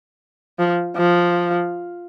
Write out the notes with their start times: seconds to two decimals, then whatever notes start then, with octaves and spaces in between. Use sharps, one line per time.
0.59 F3
0.96 F3